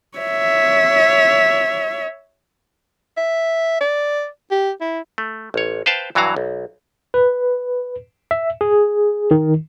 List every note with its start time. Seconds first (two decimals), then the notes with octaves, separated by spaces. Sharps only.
0.18 C#5 E5
3.17 E5
3.81 D5
4.51 G4
4.81 E4
5.18 A3
5.54 A1 C#5
5.86 B4 C5 F5 G5 A5
6.15 G2 E3 F#3 F#4 F5 A#5
6.36 B1
7.14 B4
8.31 E5
8.61 G#4
9.31 D#3